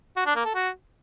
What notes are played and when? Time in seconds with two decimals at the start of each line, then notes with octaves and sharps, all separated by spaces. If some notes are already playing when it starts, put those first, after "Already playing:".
0.16 F#4
0.26 D4
0.35 A#3
0.45 A4
0.54 F#4